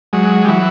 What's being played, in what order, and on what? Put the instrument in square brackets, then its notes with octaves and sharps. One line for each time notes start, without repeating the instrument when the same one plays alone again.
[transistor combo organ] F#3 G#3
G3
E3 F#3